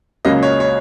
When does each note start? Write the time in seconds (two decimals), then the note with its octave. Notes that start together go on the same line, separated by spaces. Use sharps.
0.25 C#2 C#3 F#3 A#3 C#4 D#5
0.43 C#5
0.60 C#5